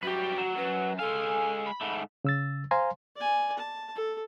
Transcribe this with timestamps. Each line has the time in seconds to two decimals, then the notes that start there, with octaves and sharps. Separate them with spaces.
0.03 F#2 G3 F#4 G4 B4
0.38 F#3
0.57 F#2 B4
0.99 G#3 A4 F5 G#5
1.66 B5
1.81 G#2 A3
2.25 C#3 E6 A6
2.71 C5 F5 G#5 A#5 C6
3.16 D5 G#5
3.58 A5
3.95 A4